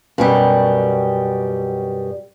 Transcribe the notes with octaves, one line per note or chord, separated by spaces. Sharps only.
F#2 B2 G3